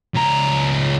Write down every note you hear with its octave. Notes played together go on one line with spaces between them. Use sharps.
C#2 A#5